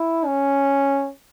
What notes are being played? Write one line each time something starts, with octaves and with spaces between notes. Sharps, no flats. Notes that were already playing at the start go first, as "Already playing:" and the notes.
Already playing: E4
C#4